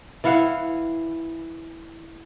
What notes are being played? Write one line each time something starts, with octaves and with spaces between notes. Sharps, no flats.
E3 E4 F5 F#5